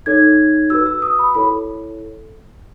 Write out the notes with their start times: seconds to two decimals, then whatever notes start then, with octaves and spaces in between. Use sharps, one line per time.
0.06 D#4 A4 C#5 G#6
0.70 F#4 B4 E6
0.86 E6
1.02 D#6
1.19 B5
1.34 E4 A4 C#5 B5